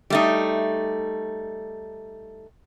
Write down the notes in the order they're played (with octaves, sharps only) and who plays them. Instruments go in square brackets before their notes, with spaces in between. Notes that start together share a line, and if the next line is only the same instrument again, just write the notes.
[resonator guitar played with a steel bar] G3 A3 D#4